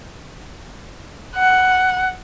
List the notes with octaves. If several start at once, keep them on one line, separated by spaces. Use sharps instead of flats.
F#5